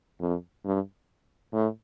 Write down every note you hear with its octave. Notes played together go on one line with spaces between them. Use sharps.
F2
G2
A2